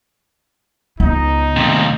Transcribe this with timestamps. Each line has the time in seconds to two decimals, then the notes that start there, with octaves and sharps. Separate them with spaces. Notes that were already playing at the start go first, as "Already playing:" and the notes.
1.00 C#2 B3 D#4
1.56 D#2 C3 A3